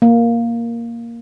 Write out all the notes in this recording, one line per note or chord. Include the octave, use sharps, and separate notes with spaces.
A#3